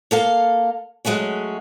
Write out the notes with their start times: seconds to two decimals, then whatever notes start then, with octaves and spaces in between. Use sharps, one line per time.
0.11 A#3 A4 F5
1.05 F#3 G#3 A3 C#4 F#4